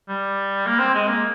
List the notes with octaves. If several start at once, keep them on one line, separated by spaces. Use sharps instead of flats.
G3
A#3
C4
G#3
A#3